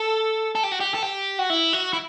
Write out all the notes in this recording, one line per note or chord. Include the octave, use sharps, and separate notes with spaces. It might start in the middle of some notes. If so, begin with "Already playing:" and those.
Already playing: A4
A4
G4
F#4
G4
A4
G4
F#4
E4
F#4
E4